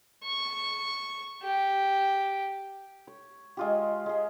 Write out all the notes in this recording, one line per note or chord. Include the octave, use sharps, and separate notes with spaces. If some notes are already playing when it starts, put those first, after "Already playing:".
C#6
G4
C#5
G#3 F4 G4
G#3 G#4